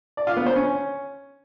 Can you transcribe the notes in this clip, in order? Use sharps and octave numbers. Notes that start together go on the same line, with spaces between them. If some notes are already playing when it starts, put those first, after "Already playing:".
D5
F4
B3
C5
C#4